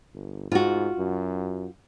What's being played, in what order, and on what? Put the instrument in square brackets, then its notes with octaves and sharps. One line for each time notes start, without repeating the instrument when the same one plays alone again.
[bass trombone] G1
[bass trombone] G#2 [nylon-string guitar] F4 F#4
[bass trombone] F#2